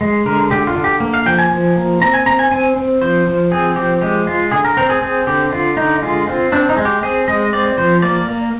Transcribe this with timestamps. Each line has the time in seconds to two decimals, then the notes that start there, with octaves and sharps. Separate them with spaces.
0.01 G#3
0.25 D3 A#4
0.51 D3 G4
0.67 F4
0.75 D3
0.84 G4
1.00 A#3
1.14 F5
1.26 F3 G5
1.38 G#5
1.51 F3
1.76 A#3
2.01 C4 A#5
2.14 G#5
2.26 C4 A#5
2.39 G#5
2.51 C4 G#5
2.76 C4
3.01 F3 C5
3.27 F3
3.52 C4 G#4
3.76 F3 G4
4.01 G#3 G4
4.27 G#3 F4
4.51 D3 G#4
4.65 A#4
4.77 C4 A#4
4.90 G#4
5.02 C4 G#4
5.27 D3 G4
5.52 D3 F4
5.77 D3 D#4
6.02 G#3 F4
6.27 C4 F4
6.52 C4 D4
6.69 D#4
6.77 G#3
6.85 G4
7.03 C4 G#4
7.28 G#3 D#5
7.53 C4 D5
7.78 F3 C5
8.02 A#3 D5
8.28 A#3